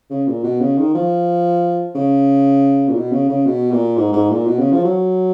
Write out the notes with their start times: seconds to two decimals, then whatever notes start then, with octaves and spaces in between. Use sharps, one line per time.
0.10 C#3
0.28 A#2
0.44 B2
0.61 C#3
0.78 D#3
0.95 F3
1.95 C#3
2.88 A#2
2.96 B2
3.12 C#3
3.29 C#3
3.46 B2
3.71 A#2
3.97 G#2
4.13 G#2
4.30 A#2
4.47 B2
4.59 C#3
4.72 F3
4.85 F#3